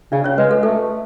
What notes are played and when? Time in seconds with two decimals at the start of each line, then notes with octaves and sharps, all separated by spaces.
0.12 C#3 D4 D5
0.24 C#4 C#5
0.38 G#3 B4
0.51 A4
0.63 A3 A4